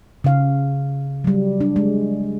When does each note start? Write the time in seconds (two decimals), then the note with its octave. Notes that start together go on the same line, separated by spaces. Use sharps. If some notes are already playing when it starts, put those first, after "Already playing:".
0.24 C#3 F5
1.24 F#3 G3
1.60 D4
1.76 G#3